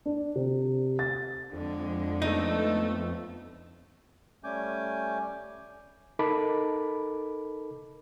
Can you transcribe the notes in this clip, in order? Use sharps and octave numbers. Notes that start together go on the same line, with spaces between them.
D4
C3
A6
F2 D3 G#3
A3 B3 D#4 A4
G3 A3 C#4 G#5 D6 G6
D#4 A4 A#4 A5 B5 D6